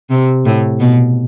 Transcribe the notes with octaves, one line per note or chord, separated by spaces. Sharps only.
C3
A2
B2